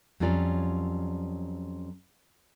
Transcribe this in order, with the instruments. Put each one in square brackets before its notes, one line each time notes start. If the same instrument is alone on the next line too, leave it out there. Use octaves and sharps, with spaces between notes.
[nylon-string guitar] F2 F#3 G3 C#4 F4 D5